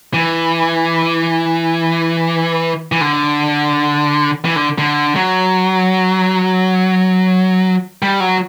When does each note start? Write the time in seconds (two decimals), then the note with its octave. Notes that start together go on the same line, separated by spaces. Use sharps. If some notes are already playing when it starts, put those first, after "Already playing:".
0.14 E3
2.92 E3
3.01 D3
4.45 E3
4.56 D3
4.78 D3
5.16 F#3
8.02 G3
8.20 F#3